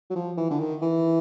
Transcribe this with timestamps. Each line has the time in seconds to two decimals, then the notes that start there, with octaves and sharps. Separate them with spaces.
0.10 F#3
0.15 F3
0.37 E3
0.51 D3
0.60 D#3
0.82 E3